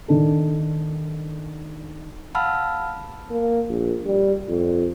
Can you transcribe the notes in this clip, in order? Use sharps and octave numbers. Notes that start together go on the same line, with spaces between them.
D#3 D4 A4
F5 F#5 A5 B5 E6 F6
A#3
A#1
G3
F2